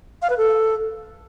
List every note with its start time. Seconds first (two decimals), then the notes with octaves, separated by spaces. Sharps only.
0.22 F5
0.30 B4
0.38 A4